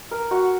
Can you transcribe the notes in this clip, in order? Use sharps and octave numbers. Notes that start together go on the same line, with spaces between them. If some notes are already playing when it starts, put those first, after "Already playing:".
A#4
F#4